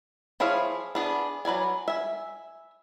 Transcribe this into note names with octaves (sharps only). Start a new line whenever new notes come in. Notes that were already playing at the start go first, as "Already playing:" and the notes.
F3 E4 G#4 C#5 F5
B3 D4 G#4
F#3 B4 D5 G#5
E5 G#5